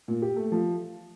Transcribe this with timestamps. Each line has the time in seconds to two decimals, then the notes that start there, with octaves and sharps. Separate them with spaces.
0.08 A#2
0.22 G4
0.36 A3
0.52 F3